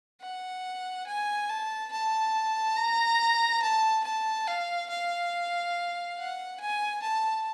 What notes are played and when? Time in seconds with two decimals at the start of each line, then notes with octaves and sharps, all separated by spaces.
0.21 F#5
1.07 G#5
1.49 A5
1.92 A5
2.76 A#5
3.62 A5
4.04 A5
4.47 F5
4.90 F5
6.18 F#5
6.60 G#5
7.02 A5